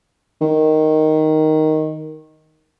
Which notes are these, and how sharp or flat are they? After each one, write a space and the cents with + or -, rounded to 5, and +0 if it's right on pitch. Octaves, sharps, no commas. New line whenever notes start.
D#3 +0